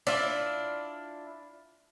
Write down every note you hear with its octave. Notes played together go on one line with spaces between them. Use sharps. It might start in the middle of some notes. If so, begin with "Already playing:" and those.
D4 E4 F4 D5